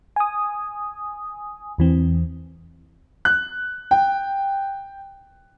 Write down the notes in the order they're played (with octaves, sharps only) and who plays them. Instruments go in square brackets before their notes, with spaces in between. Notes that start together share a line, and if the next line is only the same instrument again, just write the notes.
[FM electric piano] G#5 D#6
E2 E3 C4
[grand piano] F#6
G5